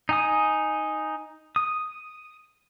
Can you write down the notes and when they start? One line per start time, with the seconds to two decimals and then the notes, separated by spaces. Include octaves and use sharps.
0.09 D#4 G#5 D#6
1.56 D#6